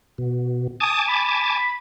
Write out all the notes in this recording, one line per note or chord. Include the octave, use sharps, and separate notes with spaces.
B2
G#5 A5 D6 D#6
B5